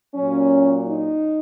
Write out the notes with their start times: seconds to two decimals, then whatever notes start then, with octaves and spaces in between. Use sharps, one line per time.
0.15 F#3 C#4
0.20 A#2
0.87 D#4